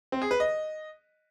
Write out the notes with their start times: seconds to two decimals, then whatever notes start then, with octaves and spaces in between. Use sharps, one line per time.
0.12 C4
0.22 G#4
0.31 B4
0.40 D#5